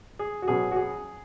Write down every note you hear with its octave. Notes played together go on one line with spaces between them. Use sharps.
G#4
F#4
B2 F#3 C#4 G#4
F#4
G#4